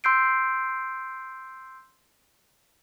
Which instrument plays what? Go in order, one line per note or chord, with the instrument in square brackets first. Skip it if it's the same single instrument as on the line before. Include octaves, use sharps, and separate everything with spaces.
[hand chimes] C6 E6 G6 C7 D7